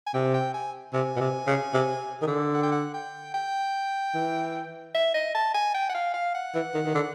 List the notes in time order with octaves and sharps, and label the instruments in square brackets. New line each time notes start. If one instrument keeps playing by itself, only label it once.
[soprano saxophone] G#5
[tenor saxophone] C3 [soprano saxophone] G5
[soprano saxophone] G5
G#5
[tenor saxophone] C3 [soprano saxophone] G#5
[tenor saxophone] B2
C3
C#3
C3
D#3
D3
[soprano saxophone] F#5
G5
F#5
G5
G5
[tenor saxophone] E3
[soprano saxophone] E5
D#5
A5
G#5
G5
F#5
F5
F5
F#5
[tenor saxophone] E3
D#3
D#3
D3